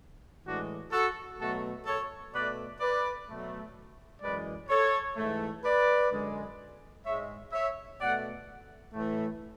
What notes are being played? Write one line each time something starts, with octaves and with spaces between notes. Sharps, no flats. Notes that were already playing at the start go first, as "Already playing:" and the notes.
A2 E3 G#3 D4 F#4
F#4 A4
B2 F#3 A3 F#4 A4
A4 C#5
B2 A3 B4 D5
B4 D5
B2 F#3 A3
F#2 E3 G#3 B4 D5
A4 C#5
G#2 E3 A3
B4 D5
F#2 D3 G#3
G#2 G#3 C#5 E5
C#5 E5
B2 A3 D5 F#5
A2 E3 A3